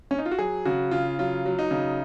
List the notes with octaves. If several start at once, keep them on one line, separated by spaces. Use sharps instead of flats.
C#4
D#4
F4
F#4
F#3 G#4
C#3 F#4
C#3 F4
F#3 F4
F#3
D#4
C#3